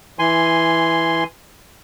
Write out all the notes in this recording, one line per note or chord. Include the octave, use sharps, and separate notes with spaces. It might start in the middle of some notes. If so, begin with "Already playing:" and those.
E3 G#5 C6